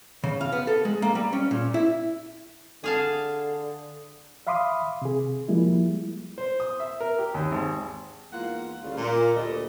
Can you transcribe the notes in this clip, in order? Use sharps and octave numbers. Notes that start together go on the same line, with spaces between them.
C#3
F5
B3
A4
G#3
A#3
G3
C#4
A#2
E4
D3 G#4 F5 A5
E5 F5 B5 C6 D6 D#6
C3 G#4
F3 G3 G#3 A#3 E4
C5
D#6
E5
A#4
G4
D#2
G#1
E2 G#2 A#3 F4 F#5
D2 C#3 G3 F4
A#2
D2 A#2 G3 A4 D#5